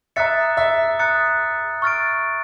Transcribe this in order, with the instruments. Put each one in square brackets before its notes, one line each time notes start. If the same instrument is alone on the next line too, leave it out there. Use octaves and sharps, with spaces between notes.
[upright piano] E5 [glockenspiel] A#5 D#6 F#6 A6 C#7
[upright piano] E5
[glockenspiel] A#5 D#6 F#6 A6 C#7
C#6 F6 A6 D7